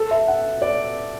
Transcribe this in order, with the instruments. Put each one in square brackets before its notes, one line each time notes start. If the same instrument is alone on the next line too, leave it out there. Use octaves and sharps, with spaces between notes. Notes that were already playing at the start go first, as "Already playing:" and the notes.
Already playing: [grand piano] A4
E5
F#5
D5